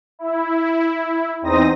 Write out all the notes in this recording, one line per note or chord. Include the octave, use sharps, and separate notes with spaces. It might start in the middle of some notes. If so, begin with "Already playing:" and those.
E4
E2 C4 D#4 C5 D#6 A#6